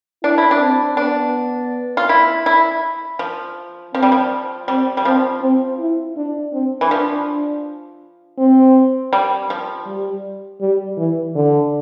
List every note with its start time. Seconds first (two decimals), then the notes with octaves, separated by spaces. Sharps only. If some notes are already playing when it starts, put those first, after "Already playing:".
0.23 D4 E4
0.38 E4
0.51 D4
0.61 C4
0.97 B3 D4
1.97 F4
2.09 E4
2.46 E4
3.19 F3
3.94 F3 C4
4.03 G3
4.12 F3
4.68 G3 C4
4.97 G3
5.05 F3 C4
5.42 C4
5.80 E4
6.16 D4
6.53 C4
6.81 E3
6.90 F3 D4
8.39 C4
9.13 G3
9.50 F3
9.87 G3
10.61 G3
10.98 E3
11.35 D3